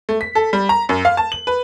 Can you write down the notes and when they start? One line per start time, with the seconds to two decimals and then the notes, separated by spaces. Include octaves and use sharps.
0.09 A3
0.21 B6
0.35 A4
0.53 G3
0.69 A#5
0.89 F#2
1.05 F5
1.17 A5
1.32 F#7
1.47 B4